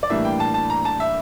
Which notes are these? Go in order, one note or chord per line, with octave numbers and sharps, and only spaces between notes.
D5
A2 E3 G3 A#3 D4 E5
G5
A5
A5
A#5
A5
E5